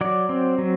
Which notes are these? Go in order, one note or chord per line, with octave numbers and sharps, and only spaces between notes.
F#3 D5
C4
F#3